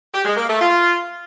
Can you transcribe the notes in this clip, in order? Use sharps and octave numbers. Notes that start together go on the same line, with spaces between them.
G4
G#3
A#3
A3
F4